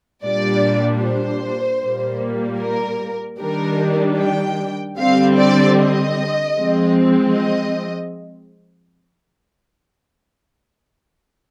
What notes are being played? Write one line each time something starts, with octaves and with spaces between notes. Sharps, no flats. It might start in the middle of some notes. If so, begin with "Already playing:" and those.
A#2 G3 D4 D5
C5
A#2 G3 A#3
A#4
D#3 G3 D4 A#4
G5
D3 G3 C4 F5
D5
D#5
F3 G#3 C4
D#5